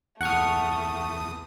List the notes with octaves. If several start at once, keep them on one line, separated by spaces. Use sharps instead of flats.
E2 A3 F#5 C#6 D#6 F6